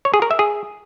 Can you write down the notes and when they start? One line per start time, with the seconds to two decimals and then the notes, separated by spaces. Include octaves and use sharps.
0.05 C#5
0.14 G#4
0.22 A#4
0.31 E5
0.39 G#4